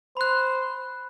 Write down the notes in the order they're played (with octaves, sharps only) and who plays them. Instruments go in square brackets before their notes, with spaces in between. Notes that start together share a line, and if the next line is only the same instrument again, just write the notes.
[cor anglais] C5 [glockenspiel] B5 F#6